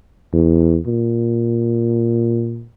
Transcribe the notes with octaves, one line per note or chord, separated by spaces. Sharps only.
E2
A#2